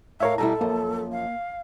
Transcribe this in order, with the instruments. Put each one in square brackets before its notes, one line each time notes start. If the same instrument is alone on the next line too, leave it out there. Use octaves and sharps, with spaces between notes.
[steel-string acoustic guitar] A2 [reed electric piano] A#4 C#5 E5 [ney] F5
[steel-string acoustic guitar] B2 G3 E4 [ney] A4 [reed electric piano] A#5
[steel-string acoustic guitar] F#2 F3 [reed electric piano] A#3
[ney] F5